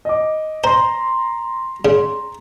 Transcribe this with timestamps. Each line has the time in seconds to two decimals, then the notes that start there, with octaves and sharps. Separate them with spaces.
0.05 D#5 D6
0.64 C5 A#5 C6
1.85 C#3